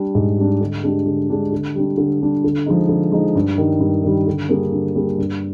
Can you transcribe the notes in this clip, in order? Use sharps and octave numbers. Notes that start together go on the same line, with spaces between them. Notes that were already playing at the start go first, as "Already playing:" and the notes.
Already playing: G3 D4
G#2
G3 D4
D3
G#3 D4 G4
D3
G#3 D4 G4
D3
G3 D4
D3
G3 D4
D3
F3 G#3 D#4
D3
F3 G#3 D#4
G2
D#3 G3
G2
D#3 G3
D3
G3 A#3 D4 G#4
D3
G3 A#3 D4 G#4
G2